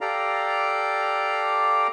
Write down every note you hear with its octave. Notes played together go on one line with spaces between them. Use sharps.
G4 A4 D5 F5 A#5